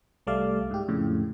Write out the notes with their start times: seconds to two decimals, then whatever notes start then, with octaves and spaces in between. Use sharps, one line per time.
0.27 C2 G3 A3 D5 F5
0.71 G#2 G4
0.88 F2 A2 C#3